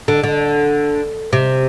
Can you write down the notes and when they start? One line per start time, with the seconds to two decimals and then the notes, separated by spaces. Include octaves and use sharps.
0.08 D3
0.23 D3
1.33 C3